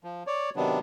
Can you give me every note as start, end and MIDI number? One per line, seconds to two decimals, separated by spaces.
0.04 0.23 53
0.27 0.50 73
0.27 0.50 74
0.56 0.79 48
0.56 0.79 51
0.56 0.79 54
0.56 0.79 59
0.56 0.79 62